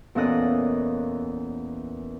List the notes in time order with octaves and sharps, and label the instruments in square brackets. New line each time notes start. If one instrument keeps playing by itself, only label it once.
[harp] E2 A#2 C#4 A4 D#5 F#6